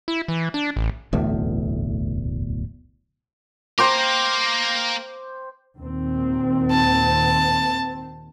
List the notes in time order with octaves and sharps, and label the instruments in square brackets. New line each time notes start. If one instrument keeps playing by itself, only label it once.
[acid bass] E4
E3
D4
A1
[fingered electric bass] D1 B1 E2 A3
[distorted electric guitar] A#3 A#4 [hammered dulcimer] C5 G5 D6
[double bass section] D#2 A#2 C4
[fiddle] A5